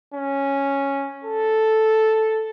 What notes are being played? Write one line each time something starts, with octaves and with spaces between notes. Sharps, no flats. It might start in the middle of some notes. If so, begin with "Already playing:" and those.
C#4
A4